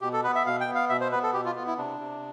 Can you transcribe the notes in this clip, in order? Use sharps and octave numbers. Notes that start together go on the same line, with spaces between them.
B2 G4
A4
B3 B4
E5
B2 F5
G5
B3
F5
B2 E5
C5
B3 B4
A4
B2 G4
F4
B3 F4
E4
C3 D4
C3